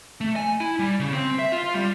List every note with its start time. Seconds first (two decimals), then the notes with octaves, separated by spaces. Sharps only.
0.21 A3
0.36 G#5
0.60 E4
0.79 G3
1.00 C#3
1.13 C4
1.39 E5
1.52 F4
1.75 G3